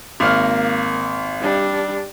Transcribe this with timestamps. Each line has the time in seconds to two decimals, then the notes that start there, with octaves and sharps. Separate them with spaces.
0.20 G#1 A#3 F6
1.40 G3 D4